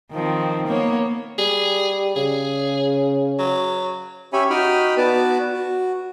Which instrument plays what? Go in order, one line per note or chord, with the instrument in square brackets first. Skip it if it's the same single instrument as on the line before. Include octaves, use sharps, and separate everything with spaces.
[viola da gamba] D#3 F3 C4
A#3 B3 C#5
[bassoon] G3 [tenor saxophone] G#4
[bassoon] C#3 [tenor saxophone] G#4
[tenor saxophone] F#3
[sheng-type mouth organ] C#4 G4 C#5 E5 G#5 B5
D#4 F#4 G5 B5 D#6 F6
B3 F#4 B4 D5 A5 D6
F#4